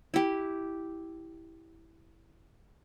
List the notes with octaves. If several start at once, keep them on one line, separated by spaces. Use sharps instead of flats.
E4 G4